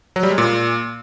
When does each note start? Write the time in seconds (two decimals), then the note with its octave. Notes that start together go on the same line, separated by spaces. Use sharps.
0.16 F#3
0.23 G3
0.31 G#3
0.38 A#2